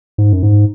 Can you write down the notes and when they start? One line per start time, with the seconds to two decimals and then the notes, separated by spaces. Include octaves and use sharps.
0.18 G#2
0.33 F#2
0.43 G#2